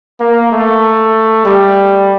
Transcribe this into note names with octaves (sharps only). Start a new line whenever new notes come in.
A#3
A3
G3